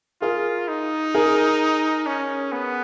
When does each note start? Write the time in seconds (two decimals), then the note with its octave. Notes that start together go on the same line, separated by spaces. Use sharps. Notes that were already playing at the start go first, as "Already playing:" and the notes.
0.22 F4 G#4 A#4
0.68 D#4
1.14 G#4 A#4
2.06 C#4
2.52 B3